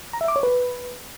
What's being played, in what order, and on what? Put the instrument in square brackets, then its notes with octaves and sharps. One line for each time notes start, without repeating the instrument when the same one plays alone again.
[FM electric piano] A#5
E5
D6
C#5
B4